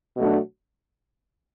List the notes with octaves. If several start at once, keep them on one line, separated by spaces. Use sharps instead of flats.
B2 F#3 A3 D4 F#4